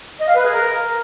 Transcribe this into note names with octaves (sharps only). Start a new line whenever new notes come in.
D#5
F5
B4
G#4
A#4